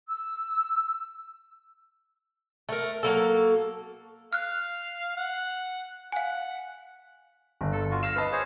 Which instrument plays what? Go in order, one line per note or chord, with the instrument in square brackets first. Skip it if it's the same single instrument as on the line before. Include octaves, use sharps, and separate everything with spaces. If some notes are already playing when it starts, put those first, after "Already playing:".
[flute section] E6
[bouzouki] A3 A#4
F#3 A#3 A4
[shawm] F5 [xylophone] F6 F#6
[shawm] F#5
[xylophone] F5 G#5 [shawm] F#5
[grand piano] G1
[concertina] A4
F4 F#4
[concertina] F5 E6 [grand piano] F6 A#6 E7
[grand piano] B4 D#5 A5
[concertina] G#4 C5 C#5